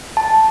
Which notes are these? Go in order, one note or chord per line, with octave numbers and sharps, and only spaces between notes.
A5